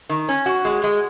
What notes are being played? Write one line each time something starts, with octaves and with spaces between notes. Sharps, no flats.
D#3
C#4
F#4
G#3
G#3